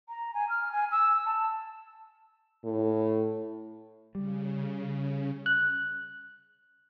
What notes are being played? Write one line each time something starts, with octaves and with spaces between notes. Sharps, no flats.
A#5
G#5
F6
G#5
E6
A5
A2
C#3 G3
F#6